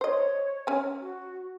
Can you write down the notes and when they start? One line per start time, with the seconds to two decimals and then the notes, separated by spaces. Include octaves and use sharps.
0.01 C5 C#5 D#5
0.67 C#4 G#5
1.00 F#4